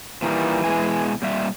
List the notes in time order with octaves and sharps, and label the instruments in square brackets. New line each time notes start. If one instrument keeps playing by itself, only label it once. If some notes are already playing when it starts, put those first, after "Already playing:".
[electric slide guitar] A#2 D#3 G3 [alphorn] E3
[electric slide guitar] B2 G#3 G#5
A#2 G3 E5